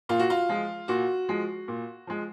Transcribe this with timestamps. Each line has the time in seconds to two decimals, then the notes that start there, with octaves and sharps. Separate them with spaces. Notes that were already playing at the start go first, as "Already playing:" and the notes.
0.09 A#2 F4
0.19 F#4
0.30 F4
0.49 F3 G#3
0.88 A#2 F#4
1.29 F3 G#3
1.68 A#2
2.07 F3 G#3